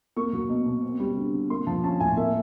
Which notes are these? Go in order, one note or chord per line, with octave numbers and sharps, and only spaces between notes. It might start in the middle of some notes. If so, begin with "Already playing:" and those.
A#3 C#6
F#3
B2
B2
C4
G3
D3
D3
A#3 C6
F3 A5
C#4 A5
A2 G#5
A#3 E5